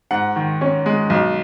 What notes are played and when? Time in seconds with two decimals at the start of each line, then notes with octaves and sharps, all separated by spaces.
0.11 G#2 F#5
0.36 D#3
0.61 C#4
0.86 G#3
1.10 B1